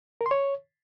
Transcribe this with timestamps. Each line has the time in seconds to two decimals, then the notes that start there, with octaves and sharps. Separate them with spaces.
0.21 A#4
0.26 C6
0.31 C#5